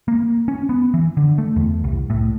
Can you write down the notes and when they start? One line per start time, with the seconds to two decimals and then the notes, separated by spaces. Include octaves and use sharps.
0.08 A#3
0.48 C#4
0.69 B3
0.94 E3
1.17 D3
1.38 A3
1.56 E2
1.84 C2
2.10 A2